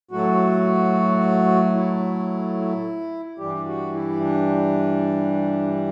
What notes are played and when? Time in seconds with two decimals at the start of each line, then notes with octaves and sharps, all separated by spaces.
0.11 A2 F#3 A3 F#4
1.74 E4
3.38 G2 E3 G3 G4
3.66 F#4
3.94 E4
4.21 D4